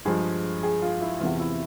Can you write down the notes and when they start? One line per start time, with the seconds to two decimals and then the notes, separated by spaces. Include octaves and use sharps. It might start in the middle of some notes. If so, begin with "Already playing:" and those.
0.05 G2 F3 G#3 G#4
0.63 G#4
0.82 F4
1.01 E4
1.20 E2 C3 E3 F4
1.40 E4